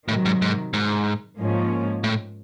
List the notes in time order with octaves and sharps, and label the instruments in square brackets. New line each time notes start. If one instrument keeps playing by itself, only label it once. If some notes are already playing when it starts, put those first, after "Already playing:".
[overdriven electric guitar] A2 [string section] C3 D#3 F#3
[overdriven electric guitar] G#2
G#2
G#2
[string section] G#2 F3 A#3 C#4
[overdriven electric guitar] A2